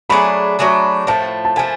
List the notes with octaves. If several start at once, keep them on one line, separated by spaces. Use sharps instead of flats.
F#3 A3 D4 G#4 B5
F#3 A3 D4 G#4
A2 F3 A3 A5
A5
F3 A3 G#5